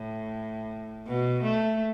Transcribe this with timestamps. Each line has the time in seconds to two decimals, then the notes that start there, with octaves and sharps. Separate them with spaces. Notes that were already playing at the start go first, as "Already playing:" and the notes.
Already playing: A2
1.08 B2
1.44 A3